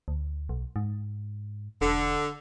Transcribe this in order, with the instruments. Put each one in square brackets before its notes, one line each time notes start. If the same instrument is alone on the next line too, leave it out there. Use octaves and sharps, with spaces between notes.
[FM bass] D2
B1
G#2
[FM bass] E1 [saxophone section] D3